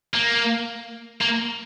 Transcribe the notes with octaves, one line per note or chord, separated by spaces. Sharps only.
A#3
A#3